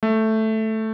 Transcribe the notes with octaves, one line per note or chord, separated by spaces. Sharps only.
A3